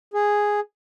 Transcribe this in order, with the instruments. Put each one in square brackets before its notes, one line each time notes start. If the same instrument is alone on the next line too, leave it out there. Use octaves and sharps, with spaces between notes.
[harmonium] G#4